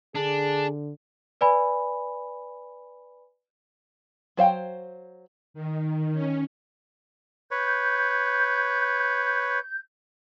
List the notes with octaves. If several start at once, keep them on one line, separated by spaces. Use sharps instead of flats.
D3 D4 G#4
B4 D5 G#5 B5
F#3 C5 F5 G5
D#3
C#4
B4 C#5 G6